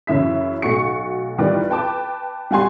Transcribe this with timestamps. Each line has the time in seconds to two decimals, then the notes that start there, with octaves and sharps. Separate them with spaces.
0.07 F#2 C#3 E3 E5 B6
0.62 B1 A3 F#4 C#6 C#7
1.38 D#3 E3 G3 F4 B4 D5
1.70 B4 G5 A5 D6
2.51 G3 G4 F#5 G#5 C6